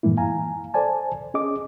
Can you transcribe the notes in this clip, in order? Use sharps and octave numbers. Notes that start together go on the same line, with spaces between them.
F#2 A2 E3 G#3 A#3 E4
F5 G#5 A#5
A4 C5 D5 G#5 A5
C#4 G#4 D#5 D6